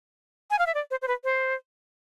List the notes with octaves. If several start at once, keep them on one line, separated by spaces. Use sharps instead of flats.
G#5
F5
E5
D5
C5
C5
B4
C5